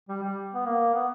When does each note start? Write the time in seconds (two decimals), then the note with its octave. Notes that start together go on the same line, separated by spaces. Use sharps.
0.09 G3
0.23 G3
0.54 B3
0.66 A#3
0.95 B3